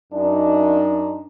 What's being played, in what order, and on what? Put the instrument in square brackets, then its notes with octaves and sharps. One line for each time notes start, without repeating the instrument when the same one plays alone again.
[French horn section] F#2 D4 D#4